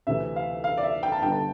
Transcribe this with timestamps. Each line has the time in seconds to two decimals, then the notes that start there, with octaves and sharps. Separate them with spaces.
0.07 D2 C3 E3 E5
0.36 F5
0.64 F5
0.77 D5
0.83 E5
1.03 G5
1.12 A5
1.22 G1 G2 D3 G5
1.32 A5